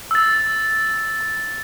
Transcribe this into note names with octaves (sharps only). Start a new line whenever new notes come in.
E6 A6